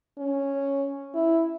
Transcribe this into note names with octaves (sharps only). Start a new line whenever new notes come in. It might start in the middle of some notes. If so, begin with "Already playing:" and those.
C#4
E4